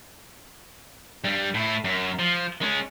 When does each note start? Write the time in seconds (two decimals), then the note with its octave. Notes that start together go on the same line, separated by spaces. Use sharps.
1.24 G2 G3
1.54 A2 E4
1.84 F#2
2.19 F3
2.62 G#3 C#4